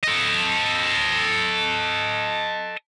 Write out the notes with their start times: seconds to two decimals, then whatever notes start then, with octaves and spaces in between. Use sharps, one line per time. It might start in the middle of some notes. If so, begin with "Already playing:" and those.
0.03 A4 D#5